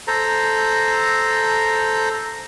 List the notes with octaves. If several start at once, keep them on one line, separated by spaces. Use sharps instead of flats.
A4 C5 A#5